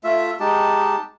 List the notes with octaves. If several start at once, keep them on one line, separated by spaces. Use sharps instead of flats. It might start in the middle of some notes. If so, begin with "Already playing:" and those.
A3 F4 E5
G#3 D#4 G4 A5